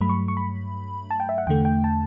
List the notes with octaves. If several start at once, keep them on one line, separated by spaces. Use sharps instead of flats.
G2 F#3 A3 B5
C#6
C#6
B5
A5
G5
E5
F#5
E2 D3 A3 G5
G5
A5